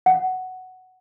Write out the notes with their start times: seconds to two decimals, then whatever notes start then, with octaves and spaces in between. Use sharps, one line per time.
0.06 F#5